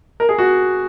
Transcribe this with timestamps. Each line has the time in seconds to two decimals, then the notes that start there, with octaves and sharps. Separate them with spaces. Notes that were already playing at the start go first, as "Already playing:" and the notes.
0.20 A#4
0.29 G#4
0.38 F#4